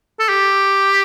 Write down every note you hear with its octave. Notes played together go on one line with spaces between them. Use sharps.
A4
G4